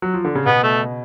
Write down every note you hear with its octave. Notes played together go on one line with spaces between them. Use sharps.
F#3
F3
D3
C#3
B2 B3
A3